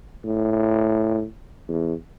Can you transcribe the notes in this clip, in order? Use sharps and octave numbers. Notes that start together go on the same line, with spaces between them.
A2
E2